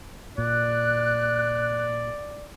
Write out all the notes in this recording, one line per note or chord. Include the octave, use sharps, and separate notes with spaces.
A#2 D5 F#6